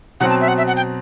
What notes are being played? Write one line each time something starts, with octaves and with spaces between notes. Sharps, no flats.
B2 F#3 C4 F#5
A5
E5
F#5
E5
F#5
G5